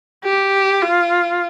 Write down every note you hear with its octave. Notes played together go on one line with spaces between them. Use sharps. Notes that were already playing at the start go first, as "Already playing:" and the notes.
G4
F4